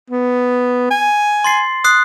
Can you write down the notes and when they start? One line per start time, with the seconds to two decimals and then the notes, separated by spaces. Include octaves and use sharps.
0.10 B3
0.91 G#5
1.44 C6 A6 C7
1.84 D#6 F#6 C7